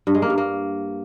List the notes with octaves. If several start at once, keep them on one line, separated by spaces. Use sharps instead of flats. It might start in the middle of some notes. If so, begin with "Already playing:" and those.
G2
G#3
A#3
G2
A#3